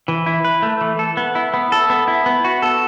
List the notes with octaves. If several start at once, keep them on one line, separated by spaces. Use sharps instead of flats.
E3
E4
B4
A3
E3
A4
B3
E4
B3
A4
B3
E4
B3
F#4
A4